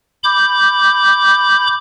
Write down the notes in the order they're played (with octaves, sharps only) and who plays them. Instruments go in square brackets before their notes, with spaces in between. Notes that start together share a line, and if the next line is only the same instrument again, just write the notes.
[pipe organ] B5 D6 G6